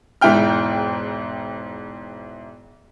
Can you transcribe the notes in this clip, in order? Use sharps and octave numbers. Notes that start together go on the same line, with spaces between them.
E1 G#2 E4 E5 G5 F6